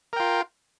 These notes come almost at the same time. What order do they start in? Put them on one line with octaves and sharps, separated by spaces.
A#4 G5 F4